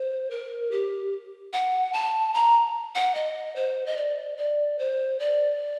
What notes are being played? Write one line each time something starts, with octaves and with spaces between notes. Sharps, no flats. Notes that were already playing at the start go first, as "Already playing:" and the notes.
Already playing: C5
A#4
G4
F#5
A5
A#5
F#5
D#5
C5
D#5
D5
D5
C5
D5